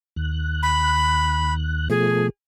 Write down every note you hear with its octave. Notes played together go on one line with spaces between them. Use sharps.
D#2 F#6
B5
B2 F3 A3 G#4